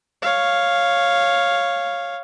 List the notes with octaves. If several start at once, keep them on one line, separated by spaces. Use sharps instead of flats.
C#5 F5